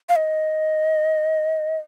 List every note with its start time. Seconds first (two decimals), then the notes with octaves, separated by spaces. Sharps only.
0.09 F5
0.16 D#5